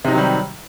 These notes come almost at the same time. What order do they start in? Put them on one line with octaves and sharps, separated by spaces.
C3 D#4 F#3 D#3 G3